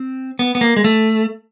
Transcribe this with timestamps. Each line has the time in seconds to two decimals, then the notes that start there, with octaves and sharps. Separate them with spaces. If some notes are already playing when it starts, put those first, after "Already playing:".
Already playing: C4
0.39 B3
0.55 B3
0.61 A#3
0.76 G#3
0.84 A3